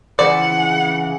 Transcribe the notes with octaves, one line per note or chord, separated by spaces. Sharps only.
C#3 E3 C5 D5 F#5